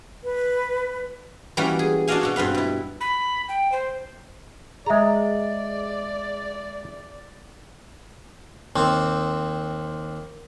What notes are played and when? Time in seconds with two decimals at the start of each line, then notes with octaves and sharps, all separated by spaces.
0.24 B4
1.57 E3 G3 A#3 C#4 F#4 B4
1.79 G#4
2.08 D4 F#4 D5 D#5 F5 G#5
2.21 B2 F#4 C#5
2.36 G2 C4 B4 F5
2.54 B2 E4
3.01 B5
3.48 G5
3.72 C5
4.86 G#3 G#4 D5 E5 A#5
8.76 D#2 C4